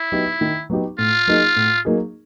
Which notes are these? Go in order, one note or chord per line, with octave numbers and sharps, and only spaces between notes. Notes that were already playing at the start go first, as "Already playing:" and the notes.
Already playing: E4
F#3 B3 D#4 G4
D#3
F#3 B3 D#4 G4
A2 F4
F#3 A#3 D#4 G#4
A2
F#3 A#3 D#4 G#4